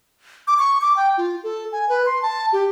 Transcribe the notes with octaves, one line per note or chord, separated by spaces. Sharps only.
D6
C#6
D6
G5
F4
A4
G#5
B4
C6
A5
G4